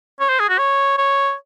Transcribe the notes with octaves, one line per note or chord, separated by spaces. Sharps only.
C#5
C5
G#4
F#4
C#5
C#5